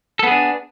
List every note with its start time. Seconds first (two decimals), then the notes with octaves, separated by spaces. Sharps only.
0.19 A4
0.23 B3
0.27 G#4
0.31 D4